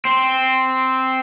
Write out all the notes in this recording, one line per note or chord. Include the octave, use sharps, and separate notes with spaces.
C4